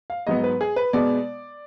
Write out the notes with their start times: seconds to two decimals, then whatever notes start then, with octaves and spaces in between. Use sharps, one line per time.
0.10 F5
0.27 G#2 F#3 B3 D#5
0.44 B4
0.61 G#4
0.76 B4
0.93 B2 G#3 B3 D5